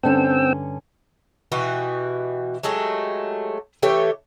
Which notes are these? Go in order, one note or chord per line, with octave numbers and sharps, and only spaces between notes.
G2 D3 C4 C#4 G5 E6
B2 E3 F#4 G4
F#3 G#3 A3 G4
E3 A3 G4 C#5